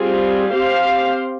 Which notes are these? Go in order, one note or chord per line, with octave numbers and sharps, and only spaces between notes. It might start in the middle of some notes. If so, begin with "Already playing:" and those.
Already playing: G3 C4 F4 G#4
C4 G4 C5 F5